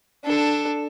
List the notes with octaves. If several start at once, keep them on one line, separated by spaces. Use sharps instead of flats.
D4 A4